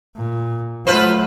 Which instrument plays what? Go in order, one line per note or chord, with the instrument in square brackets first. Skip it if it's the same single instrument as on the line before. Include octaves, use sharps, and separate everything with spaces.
[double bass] A#2
[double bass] F#3 A3 [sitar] F4 B4 C5